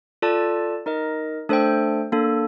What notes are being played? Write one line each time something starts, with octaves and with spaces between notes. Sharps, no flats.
F4 A4 D5 A5
D#4 A#4 D#5
A3 D4 A4 C5 G5
A#3 D4 A4